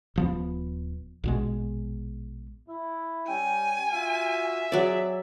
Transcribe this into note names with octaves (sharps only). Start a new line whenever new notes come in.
D#1 F3 B3
A#1 B2 G#3
E4
G3 C#4 G5 G#5
F4 F#4 E5
F#3 C4 G#4 D5